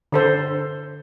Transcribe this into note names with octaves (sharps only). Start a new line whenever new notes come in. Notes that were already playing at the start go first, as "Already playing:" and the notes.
D3 A4 C5